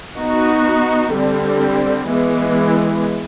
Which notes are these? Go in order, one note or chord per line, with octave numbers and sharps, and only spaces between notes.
B3 D#4 F#4
D3 G3 C4
E3 G#3 B3